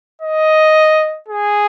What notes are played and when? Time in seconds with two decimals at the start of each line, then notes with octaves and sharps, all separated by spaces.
0.22 D#5
1.29 G#4